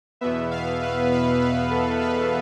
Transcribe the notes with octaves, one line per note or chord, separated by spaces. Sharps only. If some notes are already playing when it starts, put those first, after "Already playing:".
E2 B2 B3 E5
F5
B4
B4
B4
A4
B4